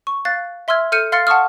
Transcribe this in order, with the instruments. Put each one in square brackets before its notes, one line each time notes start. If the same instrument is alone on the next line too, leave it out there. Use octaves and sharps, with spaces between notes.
[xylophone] C#6
F5 F#6 A6
E5 C6 E6 F6 G#6
A4 F6 G6 C#7 D#7
F5 C6 F6 A6 C7 C#7
F#5 A5 C6 C#6 D#6 F6